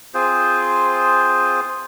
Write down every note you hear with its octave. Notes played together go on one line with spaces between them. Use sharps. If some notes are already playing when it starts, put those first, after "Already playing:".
C4 F4 G#4 C5